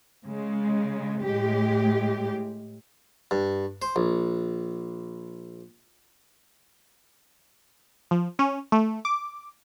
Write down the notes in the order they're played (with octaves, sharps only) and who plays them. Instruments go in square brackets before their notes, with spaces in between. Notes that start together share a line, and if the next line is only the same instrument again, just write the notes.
[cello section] C#3 G#3
A2 G#3 G4
[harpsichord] G2
C5
A#1
[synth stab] F3
C#4
A3
D6